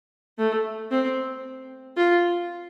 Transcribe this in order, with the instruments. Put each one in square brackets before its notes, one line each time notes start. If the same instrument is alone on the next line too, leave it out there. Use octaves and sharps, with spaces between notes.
[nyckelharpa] A3
C4
F4